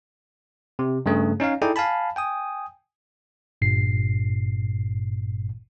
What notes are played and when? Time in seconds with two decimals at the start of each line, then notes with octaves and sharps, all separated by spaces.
0.79 C3
1.06 G2 C#3 A3
1.40 C#4 D#4 C#5 F5
1.62 D#4 E4 G#4 A4 D5 G5
1.76 F5 G#5 A5 B5
2.16 G5 G#5 D#6
3.62 G1 G2 A#2 C7